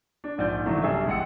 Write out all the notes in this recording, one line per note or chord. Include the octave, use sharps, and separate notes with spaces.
D4
A#1 G#2 F3 D5 G6
D3 E3 F#3 A3 C#4
B1 G2 C3 G#4 A4 E5
A1 G#3 F#5 E6 C#7